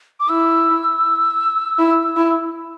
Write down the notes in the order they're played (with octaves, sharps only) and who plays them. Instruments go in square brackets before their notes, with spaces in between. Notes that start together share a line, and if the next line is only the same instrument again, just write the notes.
[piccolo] D6
[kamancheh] E4 [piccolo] E6
[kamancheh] E4
E4